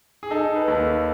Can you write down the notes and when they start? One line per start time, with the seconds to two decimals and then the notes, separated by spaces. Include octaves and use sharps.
0.23 G#4
0.31 D#4 A4
0.56 B4
0.68 D#2 A4